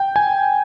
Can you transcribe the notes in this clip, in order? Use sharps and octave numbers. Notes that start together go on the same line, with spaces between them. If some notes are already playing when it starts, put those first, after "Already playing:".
Already playing: G5
G#5